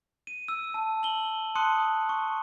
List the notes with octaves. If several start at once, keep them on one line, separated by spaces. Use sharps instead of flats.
D#7
E6
A5 E6
F#7 G7
A5 C6 D#6 F#6 C#7
C#6